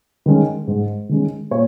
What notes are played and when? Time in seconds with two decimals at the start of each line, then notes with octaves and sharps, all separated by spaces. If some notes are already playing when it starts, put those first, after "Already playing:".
0.26 D#3 G#3 C#4
0.67 G#2
1.09 D#3 G#3 C#4
1.51 A#2 C#5